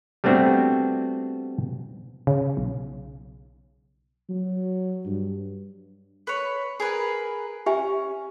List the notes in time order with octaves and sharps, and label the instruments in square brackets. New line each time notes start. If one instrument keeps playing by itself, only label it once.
[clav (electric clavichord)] G3 A3 B3 C4 D4 F#4
[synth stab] C#3
B1
[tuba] F#3
G2
[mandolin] B4 C#5
G#4 A#4 B4
[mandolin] C#4 [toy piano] G4 E5 G#5